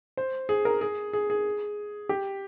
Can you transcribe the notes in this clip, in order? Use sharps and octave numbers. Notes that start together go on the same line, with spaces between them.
C5
G#4
A#4
G#4
G#4
G#4
G4